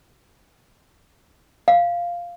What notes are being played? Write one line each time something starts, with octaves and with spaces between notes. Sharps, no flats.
F5